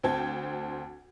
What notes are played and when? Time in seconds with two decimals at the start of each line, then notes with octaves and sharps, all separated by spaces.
0.03 D2 C4 G5 A5 G#6